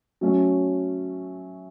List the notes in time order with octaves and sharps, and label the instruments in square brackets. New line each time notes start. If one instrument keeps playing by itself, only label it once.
[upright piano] F#3 A3 C#4